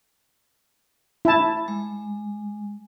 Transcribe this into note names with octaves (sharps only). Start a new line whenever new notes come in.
E4 A5
G#3